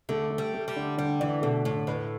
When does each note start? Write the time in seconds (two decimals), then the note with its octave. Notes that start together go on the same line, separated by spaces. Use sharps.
0.09 D3 A3
0.30 A3
0.38 G3
0.54 A3
0.68 G3
0.76 D3
0.97 D3 G3
1.20 E3 D4
1.42 B2 A3
1.65 A2 D3
1.87 A2 B4